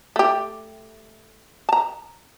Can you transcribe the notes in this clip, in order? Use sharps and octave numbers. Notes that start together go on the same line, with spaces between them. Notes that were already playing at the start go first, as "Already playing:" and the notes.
A3 G4
A5 A#5